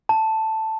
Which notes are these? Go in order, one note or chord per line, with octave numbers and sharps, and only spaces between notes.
A5